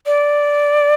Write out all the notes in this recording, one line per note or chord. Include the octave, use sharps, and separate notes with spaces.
D5